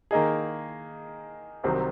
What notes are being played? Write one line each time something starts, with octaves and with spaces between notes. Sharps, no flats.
D#3 A#3 D#4 G#4
C2 C3 D#3 F#3 C4